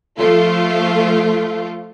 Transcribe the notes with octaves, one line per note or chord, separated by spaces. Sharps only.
F3 A3 F4